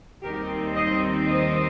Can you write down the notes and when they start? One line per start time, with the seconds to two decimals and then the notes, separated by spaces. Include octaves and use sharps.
0.23 D#2 D#3 G3 C4 D#4 G4 A#4
0.75 C5 D#5
1.27 C5 D#5